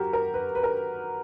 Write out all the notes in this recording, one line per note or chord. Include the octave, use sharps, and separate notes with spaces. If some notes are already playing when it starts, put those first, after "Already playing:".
Already playing: F#3 F#4 G4 A#4
A#4
B4
B4
A#4